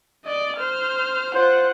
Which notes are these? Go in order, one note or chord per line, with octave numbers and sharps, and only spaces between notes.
D5 D#5
C5 F6
F4 C5 F#5